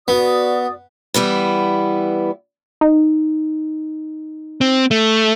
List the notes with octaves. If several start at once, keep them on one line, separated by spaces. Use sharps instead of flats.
B3 F#4 D5 D#6
E3 G3 B3 E4
D#4
C4
A3